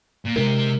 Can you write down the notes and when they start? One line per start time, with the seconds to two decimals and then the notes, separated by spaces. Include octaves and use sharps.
0.25 A#2
0.36 C3 G#3 D#4 A#4